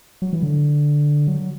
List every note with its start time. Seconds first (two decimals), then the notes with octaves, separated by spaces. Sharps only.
0.22 F#3
0.33 E3
0.43 D3
1.27 F#3